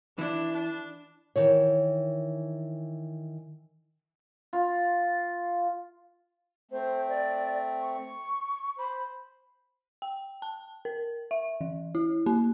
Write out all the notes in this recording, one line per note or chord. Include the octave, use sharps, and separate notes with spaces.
E3 D4 E4
D4
D#3 E3 C#5
F4
A3 C4 C5
D5
C#6
C5 B5
G5
A5
A#4
E5
E3
E4
A#3